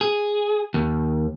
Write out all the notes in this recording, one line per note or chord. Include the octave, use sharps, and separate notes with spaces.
G#4
D#2